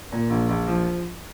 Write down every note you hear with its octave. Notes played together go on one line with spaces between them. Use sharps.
A#2
A#1
A#1
F3